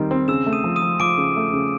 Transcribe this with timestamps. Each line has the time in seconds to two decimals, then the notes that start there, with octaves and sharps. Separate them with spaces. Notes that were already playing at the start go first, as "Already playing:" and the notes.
Already playing: D#3 G3 C4
0.11 C4
0.28 C#3 E6 E7
0.46 A3
0.53 D#6 D#7
0.64 F3
0.76 D#6 D#7
0.82 F3
1.00 F3 D6 D7
1.18 C#3
1.36 A3
1.53 C#3